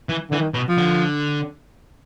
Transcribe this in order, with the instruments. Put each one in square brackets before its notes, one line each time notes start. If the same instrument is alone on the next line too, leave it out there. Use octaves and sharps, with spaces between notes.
[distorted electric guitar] E3
[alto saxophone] D3 [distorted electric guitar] E3
[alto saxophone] D#3
[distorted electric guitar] B2
[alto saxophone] F3
[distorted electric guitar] D3